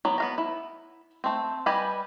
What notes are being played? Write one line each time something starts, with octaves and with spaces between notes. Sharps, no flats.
F#3 B3
B3 F5 A#5
E4
A3 C4
G3 G4 B4 D#5 G#5